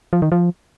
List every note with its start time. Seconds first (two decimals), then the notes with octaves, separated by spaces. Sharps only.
0.13 F3
0.22 D#3
0.32 F3